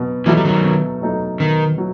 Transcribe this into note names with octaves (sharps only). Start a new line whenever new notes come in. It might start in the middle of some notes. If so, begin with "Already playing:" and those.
Already playing: B2 F#3
E3 F#3 G3 A3 D#4 A4
G3
D#3 F#3
B2
F#3 A3 D#4 A4
B2 D#3
F#3